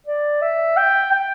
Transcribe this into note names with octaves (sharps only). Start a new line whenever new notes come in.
D5
E5
G5
G5